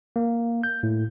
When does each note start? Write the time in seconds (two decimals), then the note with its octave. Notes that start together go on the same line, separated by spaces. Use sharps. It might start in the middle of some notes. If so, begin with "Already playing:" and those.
0.16 A#3
0.64 G6
0.83 A2